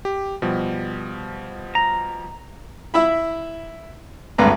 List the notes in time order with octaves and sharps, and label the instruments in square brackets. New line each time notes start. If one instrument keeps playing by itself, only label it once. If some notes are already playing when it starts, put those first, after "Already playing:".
[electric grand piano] G4
B2 F3 G3
[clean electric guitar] A#5
[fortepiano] E4 E5 B5
G#1 D2 G2 B4 A#5